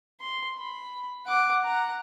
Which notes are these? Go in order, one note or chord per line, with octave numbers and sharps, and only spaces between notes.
C6
B5
F#5 D6
F#5 A#5